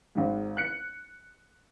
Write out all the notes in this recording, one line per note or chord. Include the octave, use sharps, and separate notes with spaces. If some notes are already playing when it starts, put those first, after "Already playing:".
G#1 G#2
F#6 C#7